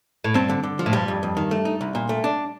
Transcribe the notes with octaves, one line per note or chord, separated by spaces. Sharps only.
A2
G2 C4
D3
D3
F3
A2
G2 G3
F2
F2
D#3
A3
D#4
C2
A#2
A3
D4